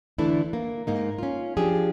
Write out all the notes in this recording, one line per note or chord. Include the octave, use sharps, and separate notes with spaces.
D3 E3 A3 D4 E4
A#3
G#2 A#3 D#4
C#4 F4
F3 D4 G4 G#4